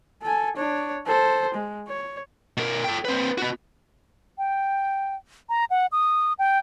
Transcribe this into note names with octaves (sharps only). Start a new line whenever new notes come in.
A4 G#5
D4 C#5
A4 C5
G#3
C#5
B2 A#4
A4 G5
C4 B4
B3 F#4
G5
A#5
F#5
D#6
G5